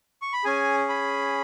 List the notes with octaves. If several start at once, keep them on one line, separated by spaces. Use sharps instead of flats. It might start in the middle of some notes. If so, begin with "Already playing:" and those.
C#6
B5
C#4 G#4 G#5
B5